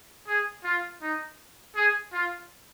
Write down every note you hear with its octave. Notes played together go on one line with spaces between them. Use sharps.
G#4
F4
D#4
G#4
F4